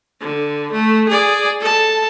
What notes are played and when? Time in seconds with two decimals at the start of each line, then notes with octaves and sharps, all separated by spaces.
0.21 D3
0.72 A3
1.08 G#4 D5
1.60 A4 A5